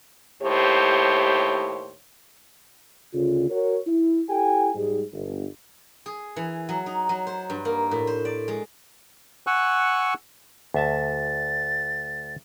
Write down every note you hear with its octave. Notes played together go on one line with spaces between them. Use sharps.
D#2 A2 G4 C5 C#5
D2 C#3 F4
F#4 A#4 C#5
E4
E4 G4 A4 G5 G#5
G#2 G3 G#4
G1
G#4
E3
F#3
D#4
F#3
C5
G2
A#3
A2
C5
D5
G#3
F#5 G#5 C#6 E6 F#6
D2 E5 A5 A6